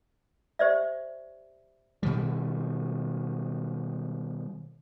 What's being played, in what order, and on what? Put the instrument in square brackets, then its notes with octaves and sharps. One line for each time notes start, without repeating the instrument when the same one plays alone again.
[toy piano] G4 C5 D5 E5
[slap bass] B2 D#3 G3